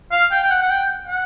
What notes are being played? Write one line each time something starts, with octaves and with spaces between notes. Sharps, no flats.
F5
G5
G5
F#5
F#5
G5
F#5